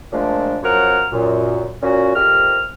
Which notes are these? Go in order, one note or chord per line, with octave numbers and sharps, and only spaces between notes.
A#2 F3 G#3 A3 D4
F#2 F3 A#4 C#5 F#5 F6
F#2 A#2
A#2 C#4 F#4
F2 C3 G4 A#4 F6